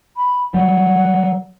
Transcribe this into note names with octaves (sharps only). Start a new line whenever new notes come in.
B5
F#3 G3 F#5